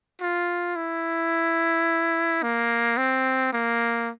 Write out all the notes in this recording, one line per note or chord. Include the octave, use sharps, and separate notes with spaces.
F4
E4
A#3
C4
A#3